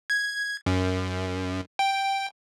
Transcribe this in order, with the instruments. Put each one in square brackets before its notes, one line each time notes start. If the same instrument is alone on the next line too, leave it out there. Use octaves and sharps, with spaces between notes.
[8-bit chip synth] G#6
F#2
G5